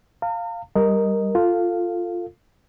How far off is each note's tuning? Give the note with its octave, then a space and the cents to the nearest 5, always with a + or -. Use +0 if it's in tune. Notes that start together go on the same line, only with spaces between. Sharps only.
F5 +0 A#5 -45
G3 +0 A#4 +0 D#5 +0
F4 +0 A4 +15 F5 +0